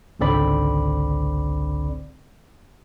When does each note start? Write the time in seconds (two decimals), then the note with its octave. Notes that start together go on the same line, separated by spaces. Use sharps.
0.20 G#1 C#2 D3 C4 D5 B5